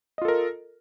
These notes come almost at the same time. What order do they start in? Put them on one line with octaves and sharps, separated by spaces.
D#5 F4 A4 A#4